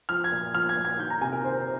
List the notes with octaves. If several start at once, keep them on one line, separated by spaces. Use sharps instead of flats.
F3 F6
G#6
A#2
F3 F6
G#6
A#2
G#6
D#3 G6
A#5
C3 G#5
A#4
D#3 C5
C5